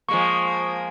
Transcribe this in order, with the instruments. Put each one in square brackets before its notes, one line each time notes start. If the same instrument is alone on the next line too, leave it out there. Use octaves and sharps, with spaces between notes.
[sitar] F3 G#3 A#3 [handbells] C#6